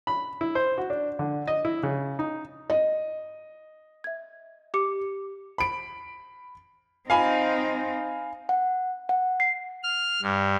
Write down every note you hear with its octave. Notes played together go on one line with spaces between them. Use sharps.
B5
E4
C5
F#4
D4
D3
D#5
E4
C#3
D#4
D#5
E5 G#6
G4 D6 C#7
B5 D7
C4 D#4 F5 G#5 B5
F#5
F#5
C7
F6
G2